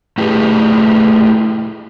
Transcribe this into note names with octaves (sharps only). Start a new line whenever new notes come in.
A3 E4 G4 G#4 B4